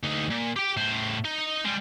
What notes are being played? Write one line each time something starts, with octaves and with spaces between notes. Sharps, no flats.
D2 D#4
A#2
G4 G5
A2 C5
D#4
G3 G#3